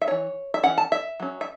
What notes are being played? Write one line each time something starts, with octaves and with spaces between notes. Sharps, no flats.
E5
E3 C#4 C#5
E5
E3 C#4 F#5
A5
E5
F#3 C#4
E5